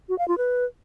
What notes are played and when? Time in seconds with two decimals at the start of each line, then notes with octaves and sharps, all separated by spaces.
0.09 F#4
0.19 F5
0.28 F4
0.38 B4